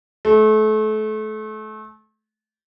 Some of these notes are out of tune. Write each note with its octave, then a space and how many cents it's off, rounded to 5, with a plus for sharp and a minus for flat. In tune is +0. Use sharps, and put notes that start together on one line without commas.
A3 -30